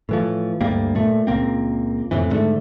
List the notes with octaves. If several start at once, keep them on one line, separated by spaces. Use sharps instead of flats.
A2 E3 F3
D2 G2 G3 A#3
A#2 A3
C#2 A#2 A#3 C4
F2 A2 C3 E3
G#2 D3 A3